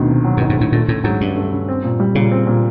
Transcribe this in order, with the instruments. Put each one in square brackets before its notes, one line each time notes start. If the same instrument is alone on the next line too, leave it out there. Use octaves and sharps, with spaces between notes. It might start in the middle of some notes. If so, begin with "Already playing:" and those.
Already playing: [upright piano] D2 D#3 [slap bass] B2
[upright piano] C3
F#3
[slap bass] G2 [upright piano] D#3
[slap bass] G#2
[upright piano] D2 [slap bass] A2
[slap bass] A#2 [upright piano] A3
[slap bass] A2 [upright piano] C#3
[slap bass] G#2 [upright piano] F#3
[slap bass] G2 [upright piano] C#3
[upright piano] A3
C#3
C4
A#2
G3
[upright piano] A#2 [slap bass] C#3
[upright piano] C4
A#2